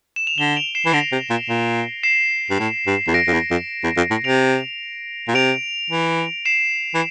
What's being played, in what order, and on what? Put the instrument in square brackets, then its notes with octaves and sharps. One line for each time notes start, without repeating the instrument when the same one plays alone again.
[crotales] E7
F7
[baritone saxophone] D3 [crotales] E7 G7
[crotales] D7 F7
C7 E7
[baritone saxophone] E3
[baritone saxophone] D3 [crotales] A#6 D7
[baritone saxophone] C3
A#2
A#2
[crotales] C7 E7
[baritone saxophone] G2
A2
G2
E2
[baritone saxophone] F2 [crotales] A#6 D7
[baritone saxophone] F2
E2
F2
E2
F2
A2
[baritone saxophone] C3 [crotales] D7 F7
[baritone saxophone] A#2
[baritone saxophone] C3 [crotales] D7 F7
[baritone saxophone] E3
[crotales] C7 E7
[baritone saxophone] E3